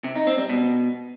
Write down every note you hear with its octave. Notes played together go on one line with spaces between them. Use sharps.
C3
D#4
C4
G3
B2